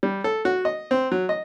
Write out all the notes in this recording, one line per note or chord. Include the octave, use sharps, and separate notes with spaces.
G3
A4
F#4
D#5
C4
F#3
D#5